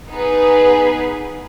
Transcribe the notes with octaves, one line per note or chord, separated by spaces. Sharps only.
B3 D#4 G#4 B4